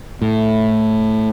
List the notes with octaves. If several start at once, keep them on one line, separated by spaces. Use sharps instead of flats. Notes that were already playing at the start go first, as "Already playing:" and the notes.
A2